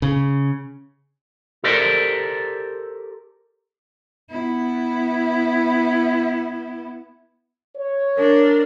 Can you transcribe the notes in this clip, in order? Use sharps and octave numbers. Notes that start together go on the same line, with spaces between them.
C#3
G4 A4 A#4 C5 D5
B3 E4
C#5
D4 A#4